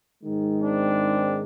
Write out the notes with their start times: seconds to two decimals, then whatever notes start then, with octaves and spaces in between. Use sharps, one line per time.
0.23 G#2 D#3 G#3
0.61 C4 D4